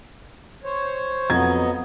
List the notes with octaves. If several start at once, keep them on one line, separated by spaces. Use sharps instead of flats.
C5 C#5
F2 F#3 B3 D#5 A#5 G#6